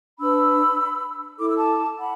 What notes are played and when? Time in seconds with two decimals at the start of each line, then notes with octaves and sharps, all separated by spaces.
0.19 D4 B4 B5 E6
1.39 E4 A4 D6
1.49 E6
1.57 A5 D6
1.99 F#5 B5